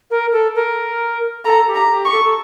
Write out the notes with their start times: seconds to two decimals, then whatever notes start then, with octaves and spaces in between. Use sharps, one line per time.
0.10 A#4
0.32 A4
0.55 A#4
1.45 A4 A#5
1.68 G4
1.75 A#5
1.90 G4
2.05 C#6
2.12 A4
2.24 A4